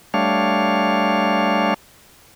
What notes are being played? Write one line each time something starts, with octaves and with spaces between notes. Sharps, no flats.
G3 A3 D4 C#5 F5